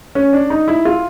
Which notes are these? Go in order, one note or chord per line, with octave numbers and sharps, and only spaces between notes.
C#4
D4
D#4
E4
F4